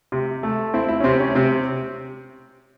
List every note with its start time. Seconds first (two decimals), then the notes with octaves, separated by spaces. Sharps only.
0.12 C3
0.43 A3
0.74 C4 E4
0.88 E4
1.00 C#4
1.04 C3 C4
1.20 C#4
1.35 C3 C4